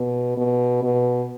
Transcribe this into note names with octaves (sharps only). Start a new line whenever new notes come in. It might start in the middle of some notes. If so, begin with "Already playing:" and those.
Already playing: B2
B2
B2